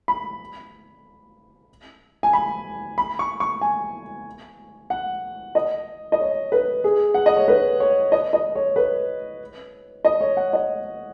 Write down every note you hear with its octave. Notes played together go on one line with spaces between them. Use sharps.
B5
G#5
B5
B5
C#6
C#6
G#5
F#5
D#5
D#5
C#5
B4
G#4
F#5
D#5
C#5
B4
C#5
D#5
D#5
C#5
B4
D#5
C#5
F#5
D#5